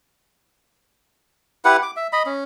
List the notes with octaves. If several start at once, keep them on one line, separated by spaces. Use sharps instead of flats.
E4 G4 B4 F#5
D6
E5
D#5 B5
C#4